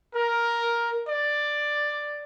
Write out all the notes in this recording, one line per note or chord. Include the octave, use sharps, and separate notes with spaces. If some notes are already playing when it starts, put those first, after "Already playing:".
A#4
D5